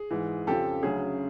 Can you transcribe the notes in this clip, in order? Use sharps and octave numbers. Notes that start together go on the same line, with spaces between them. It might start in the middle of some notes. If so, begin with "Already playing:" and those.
Already playing: G#4
G#2 E3
F2 C#3 F3 G4 A4
D2 C#3 F#3 G#4